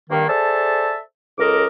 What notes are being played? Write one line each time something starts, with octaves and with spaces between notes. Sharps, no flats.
G2 D#3 A#3
G#4 A4 C5 D5 E5 A5
C#2 C#4 A4 A#4 D#5 D6